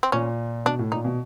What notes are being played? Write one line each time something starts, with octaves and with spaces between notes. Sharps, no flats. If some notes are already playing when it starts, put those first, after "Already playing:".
C4
A#2 C#4
B2 D4
A2
A#2 D#4
B2